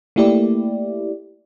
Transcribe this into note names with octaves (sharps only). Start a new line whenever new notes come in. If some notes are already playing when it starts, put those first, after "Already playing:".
A3 A#3 E4 G4 D5